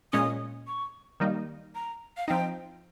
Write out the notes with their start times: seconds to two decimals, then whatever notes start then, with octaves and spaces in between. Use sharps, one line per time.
0.13 A#2 G#3 C#4 D#6
0.67 C#6
1.20 D#3 G3 A#3 D#4
1.75 A#5
2.17 F5
2.28 F3 C4 D#4 G5